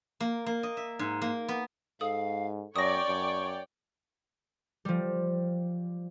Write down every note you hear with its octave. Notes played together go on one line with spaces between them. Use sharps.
A#3
A#3
D#5
E5
G#2
A#3
B3
G#2 A4 F5 D#6
F#2 C#5 D5 G5 C#6 D#6 A#6
F#2
F3 G3